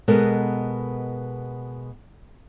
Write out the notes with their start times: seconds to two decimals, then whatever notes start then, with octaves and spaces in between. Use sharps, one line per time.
0.08 B2 G#3 B3 A4 A#4 D#5